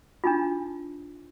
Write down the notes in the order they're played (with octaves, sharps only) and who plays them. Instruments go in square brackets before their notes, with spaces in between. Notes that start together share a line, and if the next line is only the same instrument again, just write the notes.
[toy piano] D4 D#4 F4